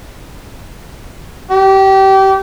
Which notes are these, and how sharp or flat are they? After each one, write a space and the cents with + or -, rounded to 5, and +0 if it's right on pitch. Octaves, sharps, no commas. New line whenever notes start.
G4 -25